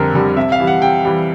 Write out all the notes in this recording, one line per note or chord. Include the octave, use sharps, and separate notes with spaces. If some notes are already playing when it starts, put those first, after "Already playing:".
Already playing: F2 D3 G3 A#4
D3 G3
C3 E5
F5
E3 G3
F#5
C3 G5
E3 G3